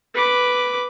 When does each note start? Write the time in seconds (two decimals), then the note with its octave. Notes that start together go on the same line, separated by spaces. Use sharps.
0.15 B4 D6